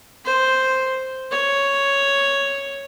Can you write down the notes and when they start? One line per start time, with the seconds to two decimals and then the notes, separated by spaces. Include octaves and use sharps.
0.25 C5
1.31 C#5